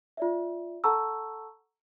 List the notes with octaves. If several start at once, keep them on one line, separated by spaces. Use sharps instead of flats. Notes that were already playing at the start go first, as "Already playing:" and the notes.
F4 D5 E5
A4 F#5 A5 A#5 C#6 E6